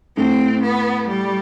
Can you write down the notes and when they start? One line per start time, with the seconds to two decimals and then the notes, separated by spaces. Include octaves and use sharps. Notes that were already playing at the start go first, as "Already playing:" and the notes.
0.17 A2 C4
0.63 B3
1.08 G3